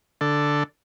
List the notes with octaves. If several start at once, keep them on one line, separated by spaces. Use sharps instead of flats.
D3 A4